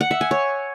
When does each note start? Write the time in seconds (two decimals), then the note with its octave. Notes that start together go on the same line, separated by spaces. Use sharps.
0.01 F#5
0.11 E5
0.21 G#5
0.31 C#5